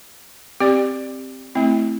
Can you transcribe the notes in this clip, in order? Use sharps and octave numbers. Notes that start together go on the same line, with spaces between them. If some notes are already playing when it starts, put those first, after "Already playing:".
C4 G4 D5
A3 C4 E4